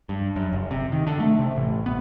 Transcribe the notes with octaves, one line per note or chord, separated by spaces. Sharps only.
G2
F#2
F#1
C3
D#3
D3
A3
C3
A1
B3